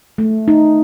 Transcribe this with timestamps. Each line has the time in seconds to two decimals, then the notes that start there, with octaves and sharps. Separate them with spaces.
0.18 A3
0.48 D#4